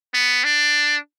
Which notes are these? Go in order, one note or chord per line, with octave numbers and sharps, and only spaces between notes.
B3
D4